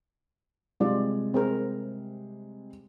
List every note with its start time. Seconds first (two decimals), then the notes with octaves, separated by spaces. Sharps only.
0.80 C3 G3 G#3 F4 D5
1.34 C4 G#4 A#4